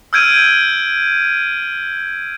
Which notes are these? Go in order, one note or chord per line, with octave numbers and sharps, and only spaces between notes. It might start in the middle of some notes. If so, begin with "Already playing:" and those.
E6 F6 G6 G#6 D7 D#7